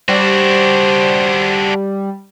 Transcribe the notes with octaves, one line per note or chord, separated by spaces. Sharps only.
G3 D4 F#4 C5